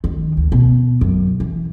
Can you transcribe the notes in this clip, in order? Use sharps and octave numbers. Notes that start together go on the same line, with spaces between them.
D#3
D2
B2
F#2
E3